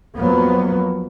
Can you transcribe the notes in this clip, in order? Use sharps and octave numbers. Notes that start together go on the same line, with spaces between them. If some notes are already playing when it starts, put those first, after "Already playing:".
F2 F#3 A#3 B3